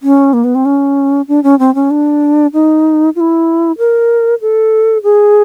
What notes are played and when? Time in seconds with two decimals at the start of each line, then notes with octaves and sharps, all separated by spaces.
0.03 C#4
0.33 A#3
0.44 B3
0.55 C4
0.65 C#4
1.28 D4
1.44 C#4
1.59 C4
1.75 C#4
1.91 D4
2.53 D#4
3.16 F4
3.20 E4
3.78 A#4
4.41 A4
5.03 G#4